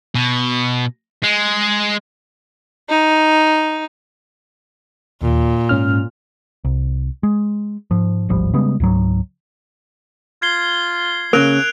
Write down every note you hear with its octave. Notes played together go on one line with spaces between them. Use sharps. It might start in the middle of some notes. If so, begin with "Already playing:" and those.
B2
G#3
D#4
D#2 A#2
G#2 C#4 F6
C2
G#3
G#2 F3
D1 G#1 F3 G3
C#3 G3 G#3 B3
C#2 G#2 F#3
F4 G#6 C7 G7
C#3 A#3 A#4 F#6 D7 F7